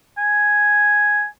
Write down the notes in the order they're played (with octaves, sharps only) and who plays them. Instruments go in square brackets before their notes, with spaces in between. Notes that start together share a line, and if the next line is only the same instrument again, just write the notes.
[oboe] G#5